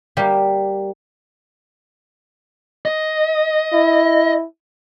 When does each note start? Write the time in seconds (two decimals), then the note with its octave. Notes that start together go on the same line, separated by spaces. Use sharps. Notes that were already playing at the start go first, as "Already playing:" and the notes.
0.17 G3 A#3 G4
2.85 D#5
3.73 E4